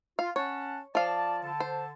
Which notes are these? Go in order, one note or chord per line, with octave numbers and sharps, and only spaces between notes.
F4 F5
C#4 C#5 F#5 A5
F3 D5 F5 A5
D3 A5
C5